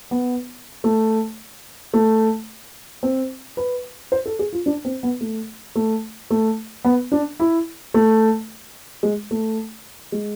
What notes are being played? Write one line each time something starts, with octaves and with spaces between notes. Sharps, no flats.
B3
A3
A3
C4
B4
C5
A4
G#4
F4
D4
C4
B3
A3
A3
A3
B3
D4
E4
A3
G#3
A3
G#3